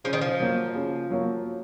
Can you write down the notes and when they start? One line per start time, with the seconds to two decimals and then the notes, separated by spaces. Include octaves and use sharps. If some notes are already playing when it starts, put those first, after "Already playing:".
0.04 C#3 F3
0.13 D#3
0.21 F3
0.40 F#3 A#3
0.75 C#3
1.10 F#3 A#3